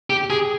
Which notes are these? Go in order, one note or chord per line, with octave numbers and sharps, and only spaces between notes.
G4
G#4